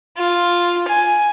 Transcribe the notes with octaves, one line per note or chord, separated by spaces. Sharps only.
F4
G#5